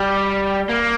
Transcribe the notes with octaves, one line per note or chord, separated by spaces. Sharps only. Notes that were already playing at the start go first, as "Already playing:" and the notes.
Already playing: G3
A#3